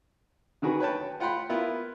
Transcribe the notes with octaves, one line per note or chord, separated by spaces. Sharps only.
D3 D#3 F#4 G#4 B4
B4 C#5 G5 A5
F4 F#5 G5 B5 C6
B3 E4 F4 A#4